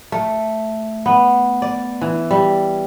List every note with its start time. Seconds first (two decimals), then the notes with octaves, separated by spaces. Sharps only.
0.12 A3
1.06 B3
1.62 D5
2.01 E3
2.31 G3